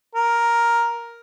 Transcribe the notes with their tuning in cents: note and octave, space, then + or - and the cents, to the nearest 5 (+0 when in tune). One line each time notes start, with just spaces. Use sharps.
A#4 +5